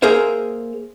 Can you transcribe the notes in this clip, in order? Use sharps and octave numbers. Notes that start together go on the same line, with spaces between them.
A#3 G#4 A#4 C5 E5